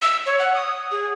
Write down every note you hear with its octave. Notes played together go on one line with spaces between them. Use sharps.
E6
C#5
F#5
D#6
G#4